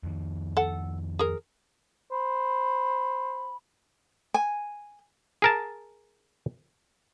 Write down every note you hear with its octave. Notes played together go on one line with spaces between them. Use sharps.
F2 D#3
A4 F#5
G#4 A#4
C5 B5
G#5
G#4 A#4 A5